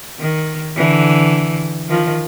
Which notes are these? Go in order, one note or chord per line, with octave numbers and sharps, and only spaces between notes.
D#3
D3 E3
D#3 F3